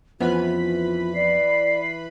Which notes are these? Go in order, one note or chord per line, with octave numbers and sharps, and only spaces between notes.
F2 E3 B3 C#4 F4 B4 B5
D5 C7